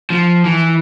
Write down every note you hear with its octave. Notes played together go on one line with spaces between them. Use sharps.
F3
E3